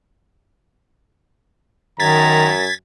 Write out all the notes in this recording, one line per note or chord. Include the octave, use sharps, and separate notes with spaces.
F#2 D#3 A#5 G#6 A6 B6